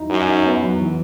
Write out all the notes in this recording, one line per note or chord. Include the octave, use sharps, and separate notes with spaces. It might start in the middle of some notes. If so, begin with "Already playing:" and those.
Already playing: D#4 E4 F#4
F#2 E4
D#4
B3
F#3
E3